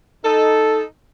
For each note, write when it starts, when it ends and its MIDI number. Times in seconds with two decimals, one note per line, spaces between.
0.24 0.83 63
0.24 0.83 69